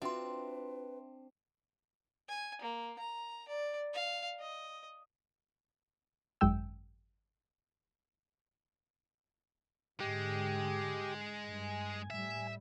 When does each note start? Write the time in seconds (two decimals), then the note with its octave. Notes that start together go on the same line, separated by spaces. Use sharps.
0.02 C4 D4 F4 F#4 B4 E5 C6
2.28 G#5
2.61 A#3
2.99 A#5
3.48 D5
3.93 F5
4.40 D#5
6.41 G#1 F#2 G#3 G5 E6
10.00 G#2 D3 G#3 G4 G5 D6
11.44 G2 G#5
12.10 A2 G3 E5